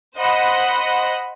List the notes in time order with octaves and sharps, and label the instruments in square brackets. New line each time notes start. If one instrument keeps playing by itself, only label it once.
[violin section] C5 D#5 F#5 B5